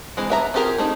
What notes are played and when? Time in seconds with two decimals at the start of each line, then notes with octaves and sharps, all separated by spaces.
0.17 E3 G#3 C4
0.30 B3 E5 A#5
0.54 C4 F4 G4 G#4 A#4
0.78 A3 C4 D#4